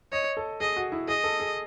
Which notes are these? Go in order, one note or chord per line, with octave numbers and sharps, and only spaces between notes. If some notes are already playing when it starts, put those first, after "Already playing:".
C#5 D#5
A4
G#4 D#5
F#4
E4
G#4 D#5
A4
G#4